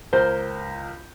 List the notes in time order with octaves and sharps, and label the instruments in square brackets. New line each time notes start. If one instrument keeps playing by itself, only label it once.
[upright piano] C#2 A#4 G6 [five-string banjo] C5